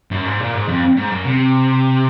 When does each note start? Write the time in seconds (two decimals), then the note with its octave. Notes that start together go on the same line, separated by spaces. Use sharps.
0.11 F#2
0.25 G#2
0.40 A#2
0.54 G#2
0.68 F2
0.97 G#2
1.11 F#2
1.26 C3